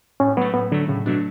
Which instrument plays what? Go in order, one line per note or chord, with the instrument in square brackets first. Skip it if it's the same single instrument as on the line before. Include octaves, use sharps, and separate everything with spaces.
[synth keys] A2 [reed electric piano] C#4
[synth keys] F#3 A3 [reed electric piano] B3
[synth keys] A2 [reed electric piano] B3
[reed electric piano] D3 [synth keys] F#3 A3
[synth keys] A2 [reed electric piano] C#3
[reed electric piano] B2 [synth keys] F#3 A3 D4